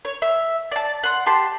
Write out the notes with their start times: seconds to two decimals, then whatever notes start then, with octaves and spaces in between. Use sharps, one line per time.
0.05 C#5
0.22 E5
0.72 D5 A5
1.03 F#5 C6
1.26 G4 A5 C6